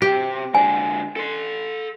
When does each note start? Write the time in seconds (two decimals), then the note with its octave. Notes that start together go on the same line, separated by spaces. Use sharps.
0.02 C3 G4
0.55 D3 G#3 G#5
1.16 A4 C6